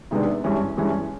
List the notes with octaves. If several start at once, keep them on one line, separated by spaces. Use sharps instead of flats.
C3 D#3 G#3 B3 D4
G2 E3 G#3 C#4
G2 E3 G#3 C#4